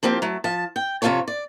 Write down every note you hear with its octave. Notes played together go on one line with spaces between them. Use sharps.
F3 A#3 C4 G4
F#3 A3
F3 A5
G5
F2 C3 B3 F4 A4 C#5
D5